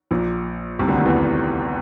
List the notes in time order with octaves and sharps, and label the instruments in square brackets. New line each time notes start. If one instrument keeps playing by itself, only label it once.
[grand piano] A#1 A#2
C2 C3
D2 D3
D#2 D#3
E2 E3